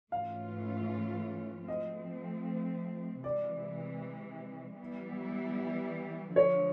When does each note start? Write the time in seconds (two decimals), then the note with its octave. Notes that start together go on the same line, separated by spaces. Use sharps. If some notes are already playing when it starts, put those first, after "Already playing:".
0.12 G#2 E3 A3 C#4 F4 F5
1.68 F3 A3 C4 D#5
3.24 C3 E3 G#3 D5
4.80 E3 G3 B3 E4
6.36 D3 F3 G#3 C#5